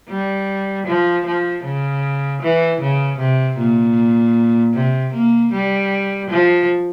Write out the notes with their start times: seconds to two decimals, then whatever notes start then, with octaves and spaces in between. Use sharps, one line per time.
0.09 G3
0.87 F3
1.26 F3
1.64 C#3
2.42 E3
2.81 C#3
3.19 C3
3.57 A#2
4.74 C3
5.13 A#3
5.53 G3
6.30 F3